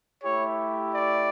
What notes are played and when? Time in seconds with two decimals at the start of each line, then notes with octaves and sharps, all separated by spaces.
0.23 A3 E4 G4 C#5
0.94 D5